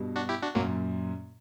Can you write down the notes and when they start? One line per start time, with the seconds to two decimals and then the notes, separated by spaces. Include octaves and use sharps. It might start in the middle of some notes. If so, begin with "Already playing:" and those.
Already playing: G2 B2
0.16 D4 F#4
0.29 E4 G4
0.42 D4 F#4
0.55 F#2 A#2 F#3 A#3